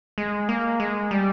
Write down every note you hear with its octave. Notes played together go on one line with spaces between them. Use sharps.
G#3
A#3
G#3
G3